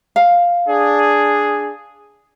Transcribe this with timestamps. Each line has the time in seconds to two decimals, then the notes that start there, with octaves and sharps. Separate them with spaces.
0.16 F5
0.67 D4 G#4